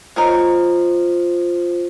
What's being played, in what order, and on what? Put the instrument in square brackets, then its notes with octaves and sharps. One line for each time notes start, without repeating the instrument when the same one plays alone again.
[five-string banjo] D#4 A#4 C#5 [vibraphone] F4 C5